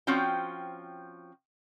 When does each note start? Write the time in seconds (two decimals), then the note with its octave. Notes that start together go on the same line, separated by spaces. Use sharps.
0.07 F3 C4 C#4 F#4 G5